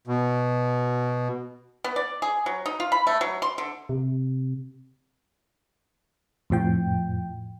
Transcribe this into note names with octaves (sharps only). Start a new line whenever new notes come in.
B2
B3
D5
G#4
F#3
D#4
F4
B5
A3
F#3
C6
D3
C3
F2 A2 F3 G5